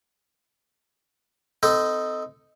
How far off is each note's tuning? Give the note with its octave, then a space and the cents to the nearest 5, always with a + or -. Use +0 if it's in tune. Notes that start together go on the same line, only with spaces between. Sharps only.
C4 -30 D#4 +0 A4 +0